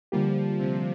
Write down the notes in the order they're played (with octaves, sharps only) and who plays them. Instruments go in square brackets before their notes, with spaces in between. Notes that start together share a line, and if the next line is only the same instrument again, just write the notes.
[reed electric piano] D3 G3 A#3 G4 [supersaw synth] F3
[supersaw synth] C3